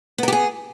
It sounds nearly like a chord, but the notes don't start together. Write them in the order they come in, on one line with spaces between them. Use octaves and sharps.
B3 A#4 G4 G#4